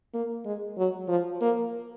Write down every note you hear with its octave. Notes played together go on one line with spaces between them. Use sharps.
A#3
G#3
F#3
F3
A#3